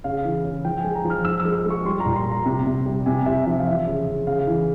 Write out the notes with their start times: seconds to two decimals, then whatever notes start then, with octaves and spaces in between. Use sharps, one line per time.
0.04 C#3 F5
0.25 E3
0.44 C#3
0.65 F3 G5
0.80 G#3 G#5
0.95 A#5
1.05 F3
1.10 F6
1.25 F3 E6
1.40 E6
1.45 G#3
1.55 E6
1.66 G#3 C#6
1.85 G3 C6
2.00 A#5
2.06 A#2
2.16 C6
2.26 G3
2.31 A#5
2.46 C3
2.66 C3
2.86 G3
3.06 C3 G#5
3.26 C3 E5
3.46 F3 E5
3.59 F5
3.67 E3 E5
3.87 C#3
4.07 C#3
4.27 C#3 F5
4.47 E3